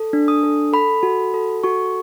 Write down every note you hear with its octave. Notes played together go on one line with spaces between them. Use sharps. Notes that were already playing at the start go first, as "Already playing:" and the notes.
Already playing: A4
D4
D#6
A4
A4 B5
F#4
A4
F#4 C#6